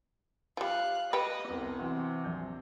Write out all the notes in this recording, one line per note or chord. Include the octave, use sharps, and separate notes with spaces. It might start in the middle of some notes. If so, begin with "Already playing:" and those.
F3 G3 F5 F#6
G3 G4 B4 D#5
C2 C3 B3
E3 C4 F#4
A#1 G6